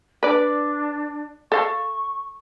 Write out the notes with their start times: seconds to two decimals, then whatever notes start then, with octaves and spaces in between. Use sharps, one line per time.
0.23 D4 B4 D5
1.52 A4 F5 C#6